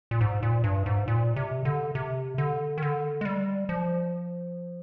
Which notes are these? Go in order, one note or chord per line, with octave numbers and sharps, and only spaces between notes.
A#2
G#2
A#2
G2
G#2
A#2
C3
D3
C3
D3
D#3
D3
G#3
G3
F3